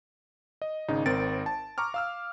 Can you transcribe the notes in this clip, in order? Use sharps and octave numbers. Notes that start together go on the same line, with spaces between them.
D#5
G#1 C#3 D#4
G#1 C4 A#4 A6 D7
A5
A#5 C#6 D6 F6
F5 E6 F6